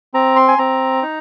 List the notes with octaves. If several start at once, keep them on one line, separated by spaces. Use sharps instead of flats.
C4 A#5
C6
G#5
C4 A#5
D#4